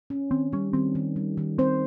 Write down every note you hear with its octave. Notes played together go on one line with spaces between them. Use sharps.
C#4
D#3 C4
G3 C#4
D#3 C4
D#3
G3
D#3
C4 C5